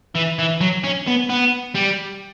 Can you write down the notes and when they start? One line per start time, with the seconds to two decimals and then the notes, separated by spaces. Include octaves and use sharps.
0.15 E3
0.39 E3
0.61 F#3
0.84 C#4
1.07 B3
1.29 B3
1.75 G3